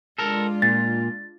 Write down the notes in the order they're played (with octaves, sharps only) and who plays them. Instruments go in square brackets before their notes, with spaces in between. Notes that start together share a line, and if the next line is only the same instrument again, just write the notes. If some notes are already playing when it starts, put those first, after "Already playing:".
[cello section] G#3 D4 F4 [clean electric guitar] A4 A#4
[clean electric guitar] A#2 [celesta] A6